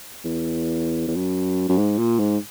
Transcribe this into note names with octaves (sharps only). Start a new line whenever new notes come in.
E2
E2
F#2
F#2
G#2
A#2
G#2